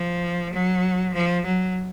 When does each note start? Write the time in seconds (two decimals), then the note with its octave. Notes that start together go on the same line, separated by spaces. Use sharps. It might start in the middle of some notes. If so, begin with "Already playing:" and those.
Already playing: F3
0.53 F#3
1.14 F3
1.45 F#3